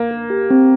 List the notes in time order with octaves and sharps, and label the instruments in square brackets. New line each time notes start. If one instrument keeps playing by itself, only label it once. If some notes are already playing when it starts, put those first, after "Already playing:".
Already playing: [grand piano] A#3
[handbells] A#4
G4
C4